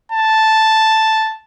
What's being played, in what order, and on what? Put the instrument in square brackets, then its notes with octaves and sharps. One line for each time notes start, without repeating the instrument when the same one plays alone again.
[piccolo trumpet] A5